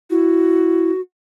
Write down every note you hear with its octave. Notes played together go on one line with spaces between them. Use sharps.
E4 F#4